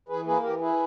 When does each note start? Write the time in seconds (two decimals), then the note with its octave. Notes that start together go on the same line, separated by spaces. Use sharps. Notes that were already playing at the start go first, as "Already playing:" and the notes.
0.08 E3 G#4 B4
0.25 A#3 G#4 B4
0.43 E3 G4 A#4
0.60 E4 G#4 B4